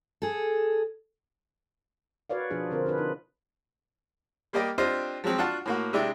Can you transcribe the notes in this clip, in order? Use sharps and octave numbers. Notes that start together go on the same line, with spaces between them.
G#4 A4
F#4 B4 C#5 D5 F5
B2 F3 D4 F4 G#4
D3 C4 F4 A#4 C5
D4 F4 G#4 B4
D#4
G3 A#3 G4 D5 D#5
C4 D4 F4 G4 C5 D#5
F3 F#3 G#3 C4
D4 F4 F#4 F#5 A5
A2 A#3 F#4
C3 G#3 D4 E4 D5 G5